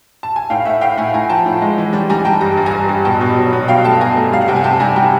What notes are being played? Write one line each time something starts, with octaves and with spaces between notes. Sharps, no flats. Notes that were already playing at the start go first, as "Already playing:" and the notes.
A5
G#5
A2 F5 G5
F5
A2 E5 F#5
A2 F5 G5
A2 F#5 G#5
A2 G#5 A#5
F3 G5 A5
A2
G#3
E3
G3
G3 G#5 A#5
G3 G5 A5
G2 A#5
G2
G#5 A#5
G2
G2
B2 G5 A5
B2
F#3
B2
B2 F5 G5
A3 G5 A5
B2 G#5 A#5
A3
G3 F5
F#5
C3 G5
G#5
C3 G5 A5
G3 G#5 A#5
G3 G5 A5